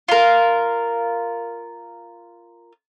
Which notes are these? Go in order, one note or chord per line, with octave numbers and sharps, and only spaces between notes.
F4 A#4